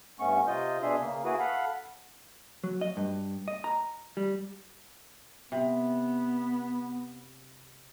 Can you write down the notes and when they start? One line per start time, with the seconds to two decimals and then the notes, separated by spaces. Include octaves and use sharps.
0.20 G2 A3 B3 C#4 C#6
0.48 C3 F4 D#5 G6
0.82 B2 D4 G#4 E5 C6
1.00 C#3 A#3
1.25 A#3 E4 F#4 G#4 B4
1.39 A4 F5 F#5 B5
2.64 F#3
2.81 D#5
2.97 G2
3.48 D#5
3.64 A#5
4.17 G3
5.52 C3 B3